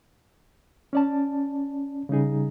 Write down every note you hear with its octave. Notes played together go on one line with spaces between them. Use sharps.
C#4 D5 A5
C#3 G3 D#4 G#4